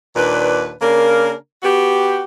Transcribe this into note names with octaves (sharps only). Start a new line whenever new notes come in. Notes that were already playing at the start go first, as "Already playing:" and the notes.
D#2 A#2 D4 B4
C#3 A#3 D4 A#4
B3 F#4 G4